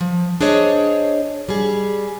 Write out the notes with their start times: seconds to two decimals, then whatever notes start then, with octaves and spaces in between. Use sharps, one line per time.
0.01 F3
0.41 D4 G#4 C5 C#5 D#5
1.49 G3 G#4